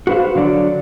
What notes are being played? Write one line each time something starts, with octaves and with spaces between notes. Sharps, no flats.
F#4 G#4 B4 C5 F5
D3 F#3 D5